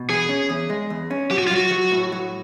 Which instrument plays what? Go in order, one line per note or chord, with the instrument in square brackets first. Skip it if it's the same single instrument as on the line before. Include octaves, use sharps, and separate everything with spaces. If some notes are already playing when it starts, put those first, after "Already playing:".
Already playing: [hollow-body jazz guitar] B2
[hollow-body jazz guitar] E2 [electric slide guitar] G#4
[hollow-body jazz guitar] C#4
E2
G#3
E2
C#4
[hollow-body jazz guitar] F#3 [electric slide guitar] G4
[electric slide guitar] F#4
F4
[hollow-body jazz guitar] F#3 [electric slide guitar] F#4
[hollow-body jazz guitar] F#3
A2
F#3